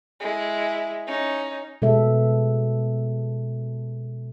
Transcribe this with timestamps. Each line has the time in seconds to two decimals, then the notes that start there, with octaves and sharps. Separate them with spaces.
0.20 G#3 E4
1.07 C#4 D#4
1.82 B2 G#3 B3 A4 E5